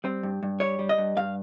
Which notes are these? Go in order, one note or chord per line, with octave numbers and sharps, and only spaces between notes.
G3 C4
G2
G2
G3 C#5
G3
D#5
G2
G2 F5